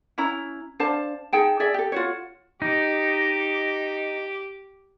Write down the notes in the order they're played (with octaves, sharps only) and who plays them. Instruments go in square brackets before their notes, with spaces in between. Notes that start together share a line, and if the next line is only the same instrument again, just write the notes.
[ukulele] C#4 E4 A#5
D4 C5 F5 A5
D#4 G#4 G5 A5
G#4 D5 E5
G4 A4
F4 F#4 C#5
[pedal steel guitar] D#4 [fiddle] G4